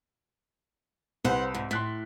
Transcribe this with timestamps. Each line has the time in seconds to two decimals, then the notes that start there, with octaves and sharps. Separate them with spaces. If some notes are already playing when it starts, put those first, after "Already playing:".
1.24 C2 B4 C5 F#5
1.54 G#2
1.71 A2 C6 F#6 B6